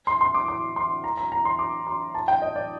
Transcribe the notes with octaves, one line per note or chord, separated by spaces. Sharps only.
C6
C6
D6
D6
C6
A#5
A#5
A#5
C6
D6
C6
A5
G5
D#5
D5